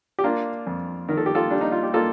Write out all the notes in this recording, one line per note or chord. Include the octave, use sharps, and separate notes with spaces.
G4
A#3 D4 F4
F2
D#3 A#4
A4
G4
F4 A4
G3 D4
D#4
F4
G4
A#3 F4 A4